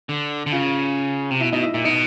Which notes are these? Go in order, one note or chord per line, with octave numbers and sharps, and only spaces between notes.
D3
D3
C#3 F4 F5
C3
B2 E4 E5
B2 D#4 D#5
E4 E5
A#2 E4 E5
B2 D#4 D#5